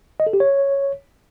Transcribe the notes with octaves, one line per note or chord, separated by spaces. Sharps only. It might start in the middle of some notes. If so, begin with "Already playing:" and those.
D#5
A4
G4
C#5